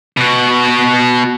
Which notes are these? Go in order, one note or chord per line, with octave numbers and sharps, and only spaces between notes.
B2 F#4